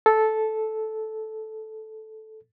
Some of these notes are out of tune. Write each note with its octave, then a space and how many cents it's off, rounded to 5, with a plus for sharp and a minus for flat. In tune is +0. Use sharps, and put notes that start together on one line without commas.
A4 -10